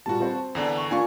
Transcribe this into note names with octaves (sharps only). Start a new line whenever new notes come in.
A#2 G3 F#4 A5
C4 C5
E2 D3 D4
C#6
A#3 D4 F4 G#5 C#6